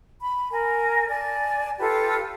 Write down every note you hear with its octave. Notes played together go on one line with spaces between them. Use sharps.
B5
A#4 G#5
D5 G#5 A5
F4 G4 A4 B4